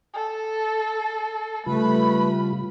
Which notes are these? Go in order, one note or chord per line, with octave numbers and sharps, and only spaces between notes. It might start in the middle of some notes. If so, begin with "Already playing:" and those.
A4
C#3 G3 A3 F4 B4 B5